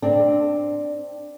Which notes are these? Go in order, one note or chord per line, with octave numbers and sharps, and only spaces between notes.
C4 D4